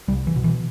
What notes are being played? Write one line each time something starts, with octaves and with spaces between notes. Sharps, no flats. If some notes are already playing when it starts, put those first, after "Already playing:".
C2 G3
E3
B2
E3